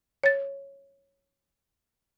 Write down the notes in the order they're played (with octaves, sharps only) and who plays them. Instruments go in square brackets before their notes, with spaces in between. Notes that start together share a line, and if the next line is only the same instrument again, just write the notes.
[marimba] C#5 A6